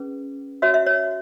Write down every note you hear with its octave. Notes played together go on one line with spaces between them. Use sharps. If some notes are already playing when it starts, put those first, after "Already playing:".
Already playing: C#4 G#4 B4
F#4 C#5 E5
E5
C#5